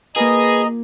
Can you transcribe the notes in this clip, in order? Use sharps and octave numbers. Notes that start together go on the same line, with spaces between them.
A#3 F4 G#4 B4 D#5 A#5